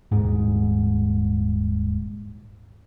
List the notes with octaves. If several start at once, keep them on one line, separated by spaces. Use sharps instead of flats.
D#1 G#2